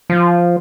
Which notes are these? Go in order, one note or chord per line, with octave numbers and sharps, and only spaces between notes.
F3